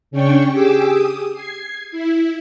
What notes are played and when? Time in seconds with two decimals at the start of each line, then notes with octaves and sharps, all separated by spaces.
0.11 C#3 C#4 D4 G5 C#6
0.50 G4 G#4 D6 E6
0.89 D#6
1.33 G#6 C7
1.92 E4